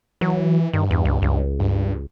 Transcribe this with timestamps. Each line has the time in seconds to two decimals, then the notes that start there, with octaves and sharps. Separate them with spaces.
0.21 E3 F#3
0.73 G2 D#3
0.91 E2
1.05 C#2
1.22 C#2
1.60 G2